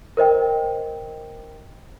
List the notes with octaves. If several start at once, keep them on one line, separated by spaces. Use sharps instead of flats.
A#4 C5 D#5 G5